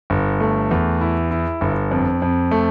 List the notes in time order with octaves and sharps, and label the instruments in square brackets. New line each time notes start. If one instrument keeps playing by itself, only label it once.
[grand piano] G1
A3
E2
E4
E4
G1
F2
F2
A3